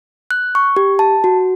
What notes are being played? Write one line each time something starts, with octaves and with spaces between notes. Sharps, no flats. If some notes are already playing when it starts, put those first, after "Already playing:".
F#6
C#6
G4
A5
F#4